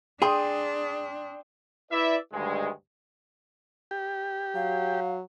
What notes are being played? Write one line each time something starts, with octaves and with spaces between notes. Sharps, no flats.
D4 G#4 G5 C6 D#6
E4 B4 D5 E5
D2 G2 D#3 G#3
G4
F#3 F5